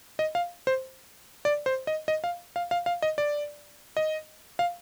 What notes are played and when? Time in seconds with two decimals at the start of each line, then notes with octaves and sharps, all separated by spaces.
0.19 D#5
0.35 F5
0.67 C5
1.45 D5
1.66 C5
1.87 D#5
2.08 D#5
2.24 F5
2.56 F5
2.71 F5
2.86 F5
3.02 D#5
3.18 D5
3.97 D#5
4.59 F5